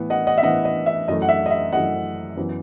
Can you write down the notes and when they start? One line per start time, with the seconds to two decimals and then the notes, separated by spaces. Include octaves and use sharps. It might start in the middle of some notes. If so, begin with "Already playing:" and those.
Already playing: A2 E3 B3
0.10 D#5 F#5
0.27 D#5 F#5
0.38 E5
0.43 A2 E3 B3 D#5 F#5
0.65 D#5
0.86 E5
1.08 F#2 E3 A3 D#5
1.22 F#5
1.29 E5
1.46 D#5
1.50 E5
1.72 F#2 E3 A3 D#5 F#5
2.37 F#2 E3 B3